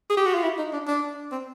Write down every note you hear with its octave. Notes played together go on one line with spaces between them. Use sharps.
G#4
G4
F#4
F4
E4
D#4
D4
D4
C4